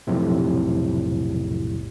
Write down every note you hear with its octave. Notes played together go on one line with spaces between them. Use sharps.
B1 F2 A2 C3